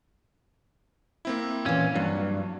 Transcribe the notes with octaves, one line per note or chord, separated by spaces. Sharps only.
A#3 C4 E4
A#2 E3 C#4
G2 F#3